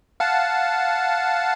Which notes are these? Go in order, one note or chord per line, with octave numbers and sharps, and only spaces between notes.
F5 F#5 A5